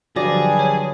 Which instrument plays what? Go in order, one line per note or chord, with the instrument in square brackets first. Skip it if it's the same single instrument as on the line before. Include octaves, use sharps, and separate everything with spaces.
[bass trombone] G2 [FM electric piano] D3 F3 F#3 [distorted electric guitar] G#4 [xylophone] D5 D6 A#6
[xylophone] C#5